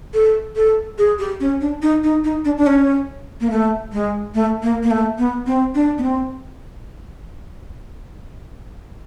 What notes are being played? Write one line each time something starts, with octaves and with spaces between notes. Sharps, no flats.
A4
A4
G#4
G4
C#4
D4
D#4
D#4
D#4
D4
D4
C#4
A#3
A3
G#3
A3
A#3
A#3
A3
B3
C4
D4
B3
C4